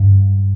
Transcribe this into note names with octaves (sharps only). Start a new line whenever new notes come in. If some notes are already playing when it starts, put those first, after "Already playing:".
Already playing: G2